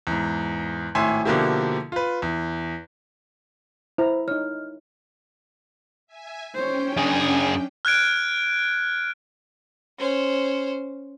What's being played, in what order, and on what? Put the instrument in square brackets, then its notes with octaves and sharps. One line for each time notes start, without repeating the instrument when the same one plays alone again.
[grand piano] E2 G#2
G#1 A2 E5 G#5 C6
B2 D3 F3 A#3 E4 G4
F4 B4
E2
[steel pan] E4 A#5 [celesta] C5
[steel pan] D#4 C#5 [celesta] F6
[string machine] E5 G#5
[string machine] C#4 G5 [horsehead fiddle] C5 C#5
[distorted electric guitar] F#2 G#4 [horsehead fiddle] D4
[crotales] F6 F#6 G#6 D7
[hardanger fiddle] C#4 C5